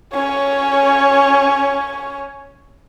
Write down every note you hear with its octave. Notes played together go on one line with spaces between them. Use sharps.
C#4 C#5